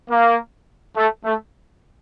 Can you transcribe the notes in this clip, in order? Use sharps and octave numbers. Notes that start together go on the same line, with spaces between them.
A#3
A3
A3